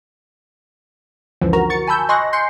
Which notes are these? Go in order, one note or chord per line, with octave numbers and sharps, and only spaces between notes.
C#2 F#2 D3 E3 F3
F#4 A#4 A#5
C#6 A6 C#7
G#5 A5 B5 E6 G6
D#5 G#5 C6 C#6 F#6 A#6
G#5 C6 G6 C7 C#7